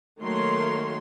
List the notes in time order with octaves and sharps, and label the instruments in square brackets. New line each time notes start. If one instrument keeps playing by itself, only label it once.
[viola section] D#3 F#3 A3 A#3 C#5 C6